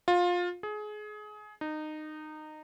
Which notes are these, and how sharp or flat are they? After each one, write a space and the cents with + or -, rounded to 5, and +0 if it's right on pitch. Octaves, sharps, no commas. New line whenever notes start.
F4 +20
G#4 +25
D#4 -20